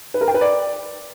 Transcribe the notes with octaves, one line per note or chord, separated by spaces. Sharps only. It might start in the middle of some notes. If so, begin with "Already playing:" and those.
B4
A#4
G5
B4
D5